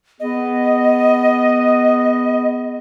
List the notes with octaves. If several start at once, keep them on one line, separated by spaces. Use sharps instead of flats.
B3 G#4 D#5